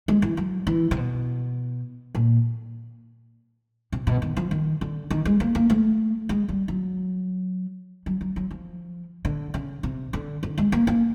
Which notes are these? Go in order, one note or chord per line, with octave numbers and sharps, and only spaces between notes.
G#3
E3
F#3
E3
C3
B2
A#2
C3
B2
D#3
F3
D#3
D3
D#3
G#3
A#3
A#3
A3
G#3
G3
F#3
F#3
F#3
F#3
F3
D3
C#3
C3
D3
D3
G#3
A#3
A#3